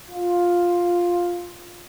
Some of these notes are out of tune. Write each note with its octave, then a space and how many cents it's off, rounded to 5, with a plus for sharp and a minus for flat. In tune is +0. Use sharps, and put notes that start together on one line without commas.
F4 +5